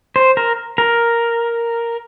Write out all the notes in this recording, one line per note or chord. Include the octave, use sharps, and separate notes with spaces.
C5
A#4
A#4